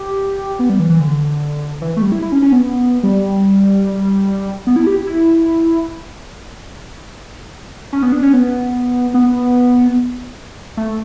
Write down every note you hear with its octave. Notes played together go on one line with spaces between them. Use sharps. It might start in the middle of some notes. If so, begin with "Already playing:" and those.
Already playing: G4
B3
G3
E3
E3
D3
E3
A3
G3
E4
E4
C#4
C#4
B3
G3
B3
E4
G4
E4
C#4
B3
D4
C#4
B3
B3
A3